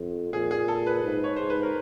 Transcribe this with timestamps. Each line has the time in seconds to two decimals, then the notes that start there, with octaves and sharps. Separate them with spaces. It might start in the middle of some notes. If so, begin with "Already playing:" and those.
Already playing: F2
0.33 A#2 G#4
0.51 G#4
0.68 A4
0.86 B4
1.04 G#2
1.24 C#5
1.36 G#2 C5
1.50 B4
1.63 A#4